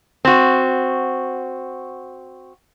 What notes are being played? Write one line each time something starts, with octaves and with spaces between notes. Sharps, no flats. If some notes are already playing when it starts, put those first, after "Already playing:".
C4 F#4